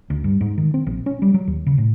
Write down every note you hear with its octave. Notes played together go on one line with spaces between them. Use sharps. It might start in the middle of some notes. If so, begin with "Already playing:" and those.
D2
G2
G#2
D#3
C4
A#1
C#4
G3
F#3
D#2
C#3
A2